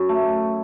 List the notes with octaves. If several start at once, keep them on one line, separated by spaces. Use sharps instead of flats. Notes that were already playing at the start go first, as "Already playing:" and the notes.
Already playing: F#2 C#5
A3